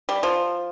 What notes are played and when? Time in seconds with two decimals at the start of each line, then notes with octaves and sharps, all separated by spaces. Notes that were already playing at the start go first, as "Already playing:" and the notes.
0.09 G3
0.23 F3